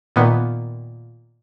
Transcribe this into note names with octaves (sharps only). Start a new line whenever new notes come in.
A#2 D#3 B3